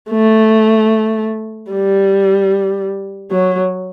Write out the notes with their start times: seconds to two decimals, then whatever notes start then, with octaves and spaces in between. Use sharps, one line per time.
0.10 A3
1.71 G3
3.31 F#3